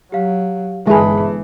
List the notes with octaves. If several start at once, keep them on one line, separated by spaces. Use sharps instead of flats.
F#3 G4 F5
G1 E3 G#3 G#4 E5 A5 B5